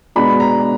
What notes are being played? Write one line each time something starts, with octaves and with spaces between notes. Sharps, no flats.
B2 G#3 B3 D4 B5
A#5